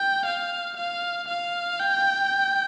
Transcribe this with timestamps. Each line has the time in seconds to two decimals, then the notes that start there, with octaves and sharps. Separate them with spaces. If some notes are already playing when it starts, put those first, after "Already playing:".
Already playing: G5
0.25 F5
0.77 F5
1.28 F5
1.79 G5